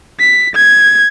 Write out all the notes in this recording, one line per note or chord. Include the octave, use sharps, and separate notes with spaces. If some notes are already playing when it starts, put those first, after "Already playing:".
B6
G#6